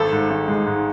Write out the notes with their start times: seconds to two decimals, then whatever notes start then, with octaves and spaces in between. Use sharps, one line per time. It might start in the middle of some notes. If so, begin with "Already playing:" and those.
Already playing: G#1 A4
0.12 G#2
0.30 G#1
0.48 G#3
0.66 G#2